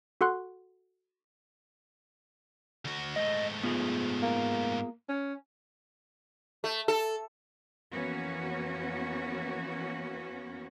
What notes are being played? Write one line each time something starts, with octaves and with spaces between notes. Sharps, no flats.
F#4 A4 F#5 C6 F#6
D2 F#4
G#2 A3 D#5
B3 F4 G#4
A#3
C#4
A3
A4
F2 E3 A#3 B3 C#4 F#4